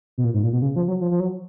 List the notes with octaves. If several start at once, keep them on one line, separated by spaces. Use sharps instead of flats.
B2
A#2
G#2
A#2
B2
C#3
F3
F#3
F3
F3
F#3